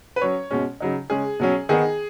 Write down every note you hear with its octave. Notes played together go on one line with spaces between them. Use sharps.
B4
F#3 C#4 C#5
B2 G#3 C#4
C#3 F#3 D#4
C#3 G#3 C#4 G#4
B2 F#3 C#4
D#3 B3 D#4 G#4